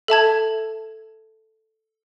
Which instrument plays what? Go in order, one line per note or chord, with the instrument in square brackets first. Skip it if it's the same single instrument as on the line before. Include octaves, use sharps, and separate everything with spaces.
[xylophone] A4 E5 A5 G#6